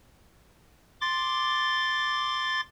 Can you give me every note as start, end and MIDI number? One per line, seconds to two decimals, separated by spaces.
1.01 2.61 84
1.01 2.61 86
1.01 2.61 93